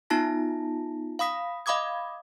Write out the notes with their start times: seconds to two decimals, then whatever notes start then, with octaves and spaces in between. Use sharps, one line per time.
0.10 B3 D#4 F4 A5 A#6
1.19 F5 B5 D#6 B6
1.66 D#5 F5 B5 D6 D#6 G#6